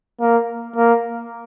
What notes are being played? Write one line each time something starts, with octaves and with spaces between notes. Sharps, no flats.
A#3
A#3